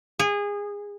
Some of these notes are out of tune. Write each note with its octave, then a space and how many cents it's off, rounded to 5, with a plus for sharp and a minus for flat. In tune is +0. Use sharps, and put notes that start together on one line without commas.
G#4 -25